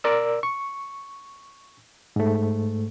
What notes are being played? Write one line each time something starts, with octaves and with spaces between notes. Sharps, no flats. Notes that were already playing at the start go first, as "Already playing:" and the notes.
A#4 D5 E6
C#6
G#2 A3